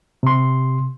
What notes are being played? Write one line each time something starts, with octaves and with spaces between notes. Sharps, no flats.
C3 C6